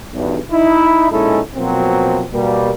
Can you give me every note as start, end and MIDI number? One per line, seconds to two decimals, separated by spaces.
0.14 0.38 35
0.14 0.38 40
0.14 0.38 43
0.52 1.09 63
0.52 1.09 64
1.11 1.40 46
1.11 1.40 56
1.11 1.40 61
1.11 1.40 63
1.11 1.40 64
1.11 1.40 69
1.55 2.24 47
1.55 2.24 53
1.55 2.24 54
1.55 2.24 58
1.55 2.24 60
2.32 2.71 47
2.32 2.71 55
2.32 2.71 58